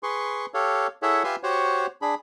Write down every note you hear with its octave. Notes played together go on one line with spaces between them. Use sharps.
G#4 B4 C6 C#6
G4 A4 C#5 F5
E4 G#4 A4 C#5 E5 F#5
F4 G4 B4 E5 G#5 C6
F#4 G4 C5 C#5 F#5
D4 G#4 B5